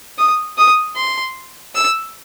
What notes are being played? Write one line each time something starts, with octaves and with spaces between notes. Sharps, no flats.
D#6
D#6
C6
E6